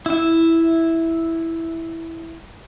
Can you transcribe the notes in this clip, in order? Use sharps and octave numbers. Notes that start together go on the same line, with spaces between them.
E4 E5